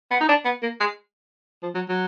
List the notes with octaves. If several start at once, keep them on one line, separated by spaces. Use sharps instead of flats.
B3
D#4
D4
B3
A#3
G#3
F3
F#3
F#3